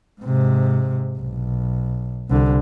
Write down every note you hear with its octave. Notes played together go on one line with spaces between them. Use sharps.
G#2 C3
B1
C2 D3